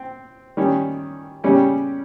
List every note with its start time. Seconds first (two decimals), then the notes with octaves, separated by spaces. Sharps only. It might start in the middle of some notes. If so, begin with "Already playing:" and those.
Already playing: C4
0.57 D#3 G3 C#4
1.44 C#3 G3 C#4 G4